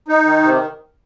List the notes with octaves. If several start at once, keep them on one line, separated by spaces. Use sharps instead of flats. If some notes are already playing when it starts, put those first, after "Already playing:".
D#4
D#3
C3